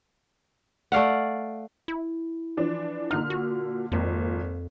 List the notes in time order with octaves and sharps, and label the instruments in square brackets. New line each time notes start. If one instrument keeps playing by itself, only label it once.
[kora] A3 D5 F5 F#5
[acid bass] E4
[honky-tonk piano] E3 F3 D4
[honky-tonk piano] A#2 D3 F6 [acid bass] D#4
[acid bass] F#4
[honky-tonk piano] G#1 A#2 [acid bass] F2